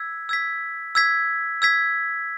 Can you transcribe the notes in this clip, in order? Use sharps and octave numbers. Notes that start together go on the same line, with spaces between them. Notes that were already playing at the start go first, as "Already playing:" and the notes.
Already playing: E6 G#6 B6
E6 G#6 B6
E6 G#6 B6
E6 G#6 B6